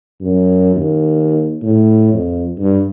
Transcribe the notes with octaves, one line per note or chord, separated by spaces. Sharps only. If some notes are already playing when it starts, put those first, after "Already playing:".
F#2
D#2
A2
F2
G2